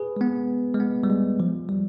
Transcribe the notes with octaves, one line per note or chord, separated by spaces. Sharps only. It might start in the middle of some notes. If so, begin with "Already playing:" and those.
Already playing: G#4 B4
G#3
B3
G#3
B3
G3
G#3
F3
G3